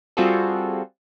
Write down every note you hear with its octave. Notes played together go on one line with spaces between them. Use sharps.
G3 C4 F4 F#4 G#4 A4